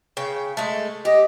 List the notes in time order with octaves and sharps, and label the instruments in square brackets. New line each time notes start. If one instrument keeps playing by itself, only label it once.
[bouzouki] C#3 G5
G#3 A3
[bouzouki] G4 [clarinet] D#5